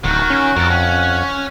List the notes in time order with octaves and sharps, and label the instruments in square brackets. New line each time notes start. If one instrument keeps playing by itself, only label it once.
[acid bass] D1 [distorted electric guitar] D#3 [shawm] F#4
[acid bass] C#4
[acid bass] F2 [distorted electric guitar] A4 A#4
[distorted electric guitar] C#4 [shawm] F#5